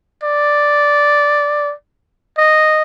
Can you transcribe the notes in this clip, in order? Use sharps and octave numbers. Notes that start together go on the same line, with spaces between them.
D5
D#5